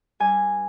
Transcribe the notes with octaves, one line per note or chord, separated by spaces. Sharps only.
G2 G#5